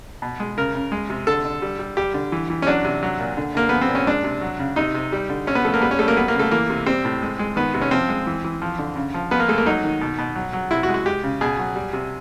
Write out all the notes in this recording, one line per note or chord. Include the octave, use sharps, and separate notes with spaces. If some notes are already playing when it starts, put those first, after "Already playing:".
B2
G#3
C#3 A#4
C#3
G#3
C3
D3 A4
D3
G3
G3
G3 G4
D3
E3
E3
C#4
F#3 D4
C3
F#3
A#2
D3
D3 A#3
F3 B3
C4
A#2
C#4
G#3 D4
C3
F#3
C#3
C3 D#4
C3
G3
D3
C3 C#4
B3
F3 A3
A#3
G3 B3
C#4
G3 A3
A#3
F#3 B3
A#3
C#3
A3
E3 A#3
C3
G3 C4
A2
G#3
G#3
D#3 B3
C3
C#4
F3 C4
G#3
E3
E3
F3
D3
C#3
F3
F3 B3
A#3
G#3 A3
A#3
F#3 D#4
D#3
B2
B2
F#3
F#3
C3 E4
F#4
G#3
F#4
G#3 G4
C#3
B2 G#4
F#3
G3
C3